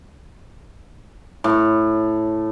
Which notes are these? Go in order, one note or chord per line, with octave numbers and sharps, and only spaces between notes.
A2